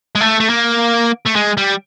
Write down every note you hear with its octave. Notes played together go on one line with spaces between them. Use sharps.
G#3
A3
A3
A#3
A3
G#3
G3